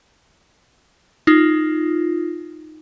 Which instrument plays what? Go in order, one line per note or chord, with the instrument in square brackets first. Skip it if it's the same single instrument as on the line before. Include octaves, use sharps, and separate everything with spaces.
[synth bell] D#4 F4